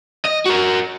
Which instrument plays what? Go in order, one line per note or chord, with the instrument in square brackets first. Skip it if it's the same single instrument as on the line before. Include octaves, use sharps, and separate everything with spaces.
[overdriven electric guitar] D#5
F#4 A#4